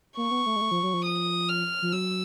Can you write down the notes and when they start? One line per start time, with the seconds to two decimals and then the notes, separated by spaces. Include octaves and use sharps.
0.17 A#3 C#6
0.31 B3
0.46 A3
0.56 G#3
0.61 A3
0.71 F3
0.83 F#3
0.94 F3
1.05 D#6
1.49 F6
1.82 F3
1.92 F#3 E6